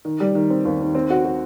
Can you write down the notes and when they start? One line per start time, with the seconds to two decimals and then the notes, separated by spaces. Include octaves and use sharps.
0.05 D#3
0.20 G3
0.35 D#3
0.50 C4
0.65 D#2
0.81 D#3
0.95 C4
1.10 F#4
1.25 F#4